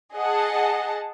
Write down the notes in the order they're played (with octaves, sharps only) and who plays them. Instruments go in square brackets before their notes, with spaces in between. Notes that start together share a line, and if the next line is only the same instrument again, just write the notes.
[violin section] G#4 D#5 F#5 A5